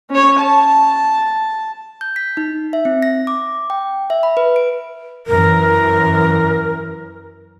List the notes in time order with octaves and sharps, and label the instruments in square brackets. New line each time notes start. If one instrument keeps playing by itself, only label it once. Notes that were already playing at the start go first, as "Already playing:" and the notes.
[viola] C#4 C#5
A5
[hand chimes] G6
B6
D#4
E5
C4
A#6
D6
G5
E5
B5
B4
D7
[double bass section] F#2 E3 [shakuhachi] A#4